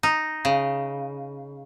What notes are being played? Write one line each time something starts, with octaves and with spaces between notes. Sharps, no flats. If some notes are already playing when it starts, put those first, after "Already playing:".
D#4
C#3